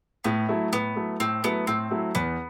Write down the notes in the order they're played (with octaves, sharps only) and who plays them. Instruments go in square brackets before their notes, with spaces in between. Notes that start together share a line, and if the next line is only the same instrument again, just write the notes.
[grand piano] A2 [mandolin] B3
[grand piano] F#3 A3 E4
[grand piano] A2 [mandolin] B3
[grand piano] F#3 A3 E4
[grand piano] A2 [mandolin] C4
[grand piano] F#3 A3 E4 [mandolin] B3
[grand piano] A2 [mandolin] C4
[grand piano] F#3 A3 E4
[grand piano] E2 [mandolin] B3